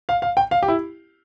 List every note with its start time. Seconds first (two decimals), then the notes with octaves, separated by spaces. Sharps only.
0.09 F5
0.22 F5
0.37 G5
0.51 F5
0.63 G4
0.68 E4